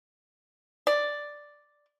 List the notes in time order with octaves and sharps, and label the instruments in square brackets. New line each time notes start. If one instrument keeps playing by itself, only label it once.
[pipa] D5